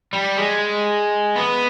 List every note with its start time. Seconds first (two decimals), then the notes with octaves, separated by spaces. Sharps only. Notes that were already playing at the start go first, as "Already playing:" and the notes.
0.13 G3
0.37 G#3
1.36 B3